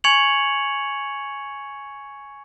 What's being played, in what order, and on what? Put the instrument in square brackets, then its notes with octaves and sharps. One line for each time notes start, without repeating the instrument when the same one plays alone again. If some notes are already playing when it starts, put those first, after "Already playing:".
[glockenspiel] G#5 C#6 G#6 C#7 F7 F#7